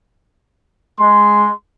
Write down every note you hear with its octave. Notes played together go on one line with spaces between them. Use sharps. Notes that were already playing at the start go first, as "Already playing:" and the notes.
G#3 C6